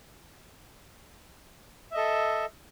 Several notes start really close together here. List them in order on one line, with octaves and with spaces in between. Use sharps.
E5 D#5 A4